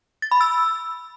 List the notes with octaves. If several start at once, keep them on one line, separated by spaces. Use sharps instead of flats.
A6
B5
E6